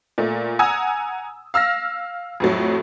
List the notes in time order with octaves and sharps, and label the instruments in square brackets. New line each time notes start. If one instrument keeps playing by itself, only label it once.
[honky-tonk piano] A#2 A3
F#5 G#5 A#5 D#6 E6 G#6
F5 E6 F6 A#6
F2 A2 F#3